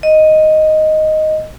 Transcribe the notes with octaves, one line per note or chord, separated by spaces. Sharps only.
D#5